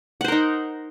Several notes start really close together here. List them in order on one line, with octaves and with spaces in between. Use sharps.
F#5 C5 A#4 D#4